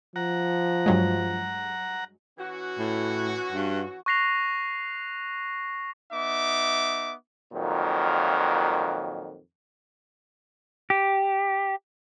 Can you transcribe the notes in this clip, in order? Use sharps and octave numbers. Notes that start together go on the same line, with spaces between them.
F3 F#5 A#5
G2 F#3 G#3
E3 C#4 F#4
A2
G2
C#6 F#6 A#6 C7 F7
B3 D#4 E5 D6
F2 A#2 D#3 F#3
G4